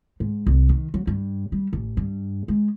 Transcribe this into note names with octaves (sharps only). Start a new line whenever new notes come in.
G#2
C2
D#3
F#3
G2
G3
A1
G2
G#3